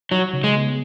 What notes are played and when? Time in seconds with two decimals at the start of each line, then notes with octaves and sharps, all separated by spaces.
0.11 F#3 D#4
0.33 C#3
0.44 G#3
0.55 B3